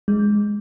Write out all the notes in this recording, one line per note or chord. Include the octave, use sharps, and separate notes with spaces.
G#3